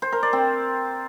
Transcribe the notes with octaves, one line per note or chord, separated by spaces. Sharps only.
C5
A#4
D5
C4